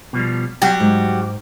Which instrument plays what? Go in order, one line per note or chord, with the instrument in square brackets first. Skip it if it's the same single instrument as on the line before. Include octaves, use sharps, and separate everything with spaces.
[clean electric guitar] B2 F3 G3
[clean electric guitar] F#3 G3 [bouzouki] F#4 G4
[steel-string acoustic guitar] G#2